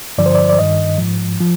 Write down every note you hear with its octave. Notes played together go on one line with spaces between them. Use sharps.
G2 D3 F3 D5
C5
D5
D5
G2 D#3 D#5
G#2 F3
F3